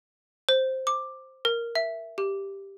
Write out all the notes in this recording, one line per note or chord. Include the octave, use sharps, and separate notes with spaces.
C5
D6
A#4
E5
G4